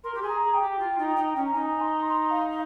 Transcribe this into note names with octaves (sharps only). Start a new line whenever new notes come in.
A#4 C6
G4
G#4 G#5
A#5
G#4
G5
G4
F4
D#4
D#4
C#4
A#5
D#4 G#5
C6
C6
F5